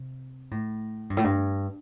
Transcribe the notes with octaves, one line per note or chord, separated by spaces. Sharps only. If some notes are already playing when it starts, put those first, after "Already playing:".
Already playing: C3
A2
G2
A2
G2